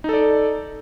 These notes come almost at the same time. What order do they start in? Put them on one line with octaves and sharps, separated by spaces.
D#4 A4 D5